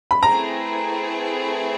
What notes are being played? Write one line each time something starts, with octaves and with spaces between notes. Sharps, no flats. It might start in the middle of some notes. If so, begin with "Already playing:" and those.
B5
A3 C4 E4 G#4 B4 A#5